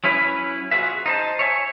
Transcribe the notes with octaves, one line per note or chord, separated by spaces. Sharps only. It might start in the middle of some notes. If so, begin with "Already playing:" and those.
F#3 C#4 E4 B4
F4 F#4 G#4 B4 E5
D#4 C5 A5
C#5 E5 G#5